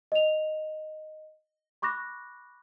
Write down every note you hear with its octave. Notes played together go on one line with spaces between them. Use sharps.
D#5 F7
B5 C#6 D6 F#6 A#6